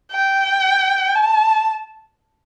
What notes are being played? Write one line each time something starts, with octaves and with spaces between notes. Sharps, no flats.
G5
A5